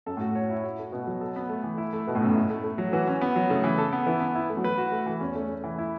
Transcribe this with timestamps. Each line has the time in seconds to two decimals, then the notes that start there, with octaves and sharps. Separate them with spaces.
0.06 F#2 A4
0.17 A2
0.21 F#4
0.35 C#5
0.50 E4
0.64 F#4
0.79 A3
0.92 B2 B3
1.07 F#3
1.21 A4
1.36 B3
1.49 A3
1.64 E3
1.78 E4
1.93 A3
2.07 B2 A3
2.15 A2
2.21 F#2 B2
2.29 A2
2.35 E4
2.50 A3
2.64 A3
2.78 F#3
2.93 E3 F#4
3.07 C#4
3.21 B3
3.36 F#3
3.50 C#3 A3
3.64 E3
3.78 A4
3.93 B3
4.06 E3 E4
4.20 B3
4.35 E4
4.50 A3
4.57 F#3
4.64 E3 B4
4.78 F#4
4.92 A3
5.06 E3
5.20 E2 C#4
5.35 A3
5.49 A3
5.64 E3
5.78 E4